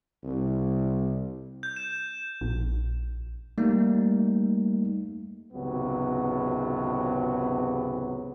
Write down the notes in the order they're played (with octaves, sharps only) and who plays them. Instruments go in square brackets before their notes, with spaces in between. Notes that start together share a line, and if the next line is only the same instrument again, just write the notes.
[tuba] C2
[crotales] G6
E7
[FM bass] A#1
[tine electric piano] G3 A3 A#3 D#4
[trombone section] G#1 C#2 C3 F#3 B3